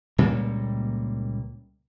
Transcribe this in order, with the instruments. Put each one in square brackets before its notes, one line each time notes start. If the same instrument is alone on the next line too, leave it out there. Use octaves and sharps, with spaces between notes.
[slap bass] C#2 A#2 G3 A#3